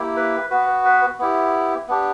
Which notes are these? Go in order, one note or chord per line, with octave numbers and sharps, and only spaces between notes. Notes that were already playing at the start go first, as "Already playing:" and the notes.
Already playing: A#3 E4 G4
B4
B3 F#4 B4
B4
B3 E4 G4
B3 D4 G4